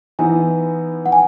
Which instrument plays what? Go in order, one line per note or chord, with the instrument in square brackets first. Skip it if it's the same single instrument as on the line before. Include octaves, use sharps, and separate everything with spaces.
[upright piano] E3 B3 D#4 [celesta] G#5
[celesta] F#5
G#5